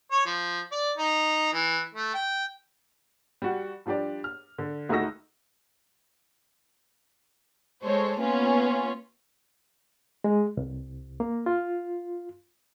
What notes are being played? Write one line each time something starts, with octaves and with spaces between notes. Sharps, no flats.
C#5
F3
D5
D#4
E3
A3
G5
G3 F#4
F3 G3 D4 G4 D5
F6
D3
C#2 A3 D#4 F#4 E6 A#6
G#3 A4 C5 C#5
A#3 B3 C#4 F4 B4
G#3
C2
A#3
F4